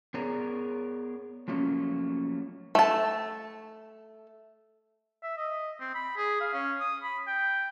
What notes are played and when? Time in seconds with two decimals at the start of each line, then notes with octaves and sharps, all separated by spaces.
0.14 B3 G#4 A#4 C#5 D5 A#5
1.48 F3 F#3 A3 A#3 C#4
2.75 A3 A5
5.23 E5
5.37 D#5
5.80 C4
5.95 B5
6.17 G#4
6.41 F5
6.53 C#4
6.80 D#6
7.03 B5
7.27 G5